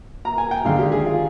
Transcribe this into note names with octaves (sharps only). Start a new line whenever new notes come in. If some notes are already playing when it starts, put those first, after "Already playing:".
A#5
G#5
G5
D#2 D3 G#3 F5
G4
G#4
F4